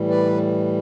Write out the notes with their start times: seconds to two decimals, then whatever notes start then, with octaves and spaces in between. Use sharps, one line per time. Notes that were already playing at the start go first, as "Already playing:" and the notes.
Already playing: A2 E3 G3
0.09 B4 D5